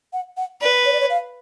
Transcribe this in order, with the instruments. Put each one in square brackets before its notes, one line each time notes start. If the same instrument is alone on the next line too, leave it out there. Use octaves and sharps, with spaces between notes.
[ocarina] F#5
F#5
[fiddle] B4 [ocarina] D5
[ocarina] C#5
D5
C#5
F5